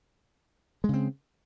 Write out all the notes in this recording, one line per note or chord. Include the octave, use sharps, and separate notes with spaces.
C#3 G#3 C4